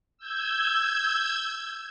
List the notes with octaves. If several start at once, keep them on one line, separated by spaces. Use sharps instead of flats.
E6 G6 G#6